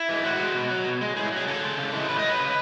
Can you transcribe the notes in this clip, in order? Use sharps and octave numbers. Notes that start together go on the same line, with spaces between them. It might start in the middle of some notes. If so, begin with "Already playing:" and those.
Already playing: E4
E3 G#3
A2 F#4
G#3
B2
F#3
B2
G#3
A2 G#4
E4
F#3 G#4
C#3 A4
G#3
C#3
E3 G#3
A2 B4
F#3 D#5
B4
C#3